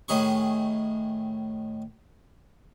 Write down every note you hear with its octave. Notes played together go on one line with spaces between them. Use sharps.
A2 D#3 G#4 C#6